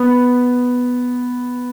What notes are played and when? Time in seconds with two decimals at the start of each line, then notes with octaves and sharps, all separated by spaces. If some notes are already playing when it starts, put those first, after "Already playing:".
Already playing: B3